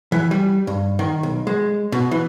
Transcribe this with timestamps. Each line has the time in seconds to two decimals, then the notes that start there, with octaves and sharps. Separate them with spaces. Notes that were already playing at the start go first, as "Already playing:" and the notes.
0.12 E3
0.31 G3
0.67 G2
0.99 D#3
1.23 B1
1.47 G#3
1.92 B2
2.11 E3